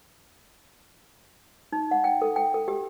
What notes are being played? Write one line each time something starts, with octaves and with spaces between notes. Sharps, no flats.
D#4
F#5
G5
A4
G5
A4
G4